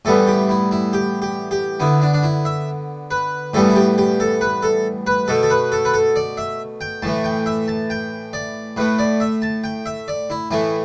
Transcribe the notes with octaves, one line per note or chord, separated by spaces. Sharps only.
A2 E3 G3 B3 A4
G4
E4
E4
G4
G4
G4
D3 B3 E4
D4
D4
E4
E5
B4
A2 E3 G3 B3 A4
E4
G4
G4
A4
B4
A4
B4
B2 A3 A4
A4
B4
A4
B4
A4
D5
E5
G5
A2 E3 A3 A5
G5
E5
A5
G5
D5
A2 A3 B4
D5
E5
A5
G5
E5
D5
E4
A2 E3 A3 E4